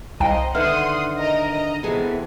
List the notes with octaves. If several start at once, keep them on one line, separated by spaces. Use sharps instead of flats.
C2 C5 D#5 F5 G5 A#5
D3 D#3 B4 E5 F#5 C6 D#6 F6
A#4 D#5 A#5
D#5 A#5
C3 E3 B3 G#4 A4